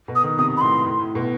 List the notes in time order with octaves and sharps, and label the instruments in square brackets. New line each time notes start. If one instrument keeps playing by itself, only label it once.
[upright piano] B2
[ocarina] D#6
[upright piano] D#3
[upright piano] C3 [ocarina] D#6
[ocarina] B5
[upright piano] A2 [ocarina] C6
[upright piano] A2
A2
B2